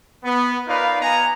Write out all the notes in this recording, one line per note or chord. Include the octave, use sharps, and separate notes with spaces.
B3
D#4 F4 A#4 B4 D5 F5
B3 G#5 A#5